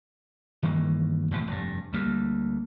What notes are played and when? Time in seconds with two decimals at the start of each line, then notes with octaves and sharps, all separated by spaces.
0.63 G2 D#3 E3 A#3
1.31 E2 A2 C3 F3
1.48 F1 G2
1.93 D2 G3 A#3